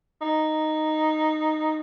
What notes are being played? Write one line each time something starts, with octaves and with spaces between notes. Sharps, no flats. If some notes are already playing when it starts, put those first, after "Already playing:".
D#4